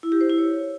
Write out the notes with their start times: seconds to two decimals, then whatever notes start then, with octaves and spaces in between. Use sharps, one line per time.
0.03 E4
0.12 G4
0.21 C5
0.30 E4
0.38 C#5